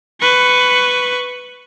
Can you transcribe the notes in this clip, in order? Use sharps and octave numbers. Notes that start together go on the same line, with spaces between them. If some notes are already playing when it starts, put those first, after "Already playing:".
B4 C#6